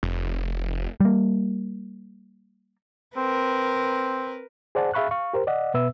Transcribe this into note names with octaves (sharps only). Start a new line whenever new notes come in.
F1
G3 A#3
C4 A#4 B4
G#4 C5 D5 F#5 A5
G#4 E5 F5 B5 C#6 F#6
F5 C#6
G4 A#4 C5
D5 D#5 F#5
B2 B3 B4 E5 E6